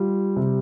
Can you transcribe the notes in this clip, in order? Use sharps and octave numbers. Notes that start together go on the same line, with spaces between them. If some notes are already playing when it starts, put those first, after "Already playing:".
Already playing: G3 F4
C3